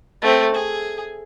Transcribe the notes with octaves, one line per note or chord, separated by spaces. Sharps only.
A3 C4
G#4